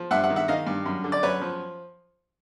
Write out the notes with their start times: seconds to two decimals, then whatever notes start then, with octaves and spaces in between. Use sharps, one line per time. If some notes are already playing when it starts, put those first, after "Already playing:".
Already playing: F3
0.11 G2 E5 F#5
0.24 E5 F#5
0.30 D#3
0.36 E5 F#5
0.48 D#3 D#5 F5
0.67 G2
0.86 F#2
1.04 D3
1.12 D5
1.23 F#2 B4 C#5
1.41 F3